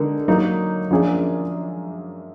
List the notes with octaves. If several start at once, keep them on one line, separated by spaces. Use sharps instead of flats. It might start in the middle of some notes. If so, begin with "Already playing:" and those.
Already playing: D3 G#3 D#4 A#4
F#3 A#3 D#4
F#2 F3 A#3 D4 G#4